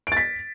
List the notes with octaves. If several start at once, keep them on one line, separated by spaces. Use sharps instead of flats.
A6 B6 D7